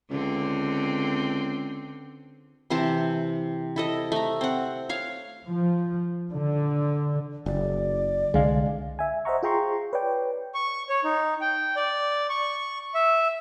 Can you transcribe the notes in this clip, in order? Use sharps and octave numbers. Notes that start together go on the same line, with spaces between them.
C#2 D3 C4
C3 E3 C5 A5
E4 A4 D#5
A3 A#5
C4 F#5
C#5 F5
F3
D3
F#1 D5
C2 D3 G#3 F5
E5 G#5
C5 D#5 E5 F#5 A#5 C#6
F4 G#4 G5 A#5 C6 C#6
B4 C#5 D5 G5
C#6
C#5
D#4
G5
D5
C#6
E5